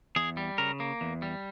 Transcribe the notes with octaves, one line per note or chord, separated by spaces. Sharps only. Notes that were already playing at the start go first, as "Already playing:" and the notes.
E2 G#4
G3
C#3 A#4
A#3
E2
G3